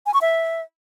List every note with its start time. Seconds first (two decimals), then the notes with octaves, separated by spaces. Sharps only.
0.06 G#5
0.14 C#6
0.21 E5